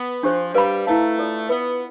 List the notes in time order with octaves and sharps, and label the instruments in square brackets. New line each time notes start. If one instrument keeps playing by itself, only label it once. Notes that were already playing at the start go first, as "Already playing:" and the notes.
Already playing: [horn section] B3
[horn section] F3 [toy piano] D4 G4 C5
[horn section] G3 [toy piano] B4 F5 B5
[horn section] A3 [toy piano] E4 B4 F5 A5
[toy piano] F4 A4 D5
[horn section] B3 [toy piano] B4 E5 B5